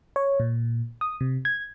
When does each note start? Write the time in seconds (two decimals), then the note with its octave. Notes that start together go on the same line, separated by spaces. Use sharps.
0.16 C#5
0.40 A#2
1.01 D#6
1.21 C3
1.45 G#6